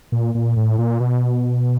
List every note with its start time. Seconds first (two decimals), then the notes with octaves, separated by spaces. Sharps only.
0.12 A#2
0.35 A#2
0.57 A2
0.78 A#2
1.00 B2